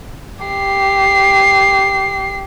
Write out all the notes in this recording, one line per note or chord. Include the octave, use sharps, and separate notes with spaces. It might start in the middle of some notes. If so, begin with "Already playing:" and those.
G4 C7